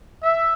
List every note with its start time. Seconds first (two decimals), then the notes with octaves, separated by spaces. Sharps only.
0.23 E5